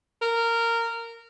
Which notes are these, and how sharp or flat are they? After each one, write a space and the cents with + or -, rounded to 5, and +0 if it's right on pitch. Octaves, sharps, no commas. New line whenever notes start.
A#4 -15